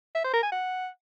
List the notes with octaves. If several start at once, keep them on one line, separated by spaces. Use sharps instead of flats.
E5
C5
A#4
G#5
F#5